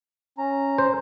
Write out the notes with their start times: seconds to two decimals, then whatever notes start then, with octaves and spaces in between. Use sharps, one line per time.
0.38 C#4 A#5
0.78 C5